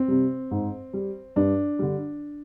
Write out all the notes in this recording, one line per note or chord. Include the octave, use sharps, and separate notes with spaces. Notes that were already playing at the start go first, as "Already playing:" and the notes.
Already playing: C4
C3 G3
G#2
G3
G2 D4
D3 G3